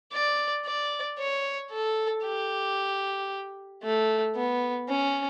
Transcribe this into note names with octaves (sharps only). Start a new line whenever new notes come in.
D5
D5
C#5
A4
G4
A3
B3
C#4